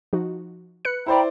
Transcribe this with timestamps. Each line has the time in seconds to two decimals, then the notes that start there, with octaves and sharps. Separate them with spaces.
0.13 F3 D#4 F#4
0.85 B4 F#6 C#7
1.06 E4 C5 D5 G5 A#5 B5